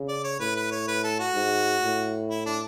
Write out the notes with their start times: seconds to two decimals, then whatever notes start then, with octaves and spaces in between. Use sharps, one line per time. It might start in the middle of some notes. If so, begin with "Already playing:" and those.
Already playing: C#3
0.08 D5
0.24 C#5
0.40 A2 B4
0.56 B4
0.71 C#5
0.88 B4
1.04 A4
1.19 F#4
1.35 G#2
1.83 A2
2.30 E4
2.46 D4